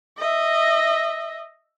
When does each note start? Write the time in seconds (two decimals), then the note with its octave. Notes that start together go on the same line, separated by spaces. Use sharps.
0.18 D#5 E5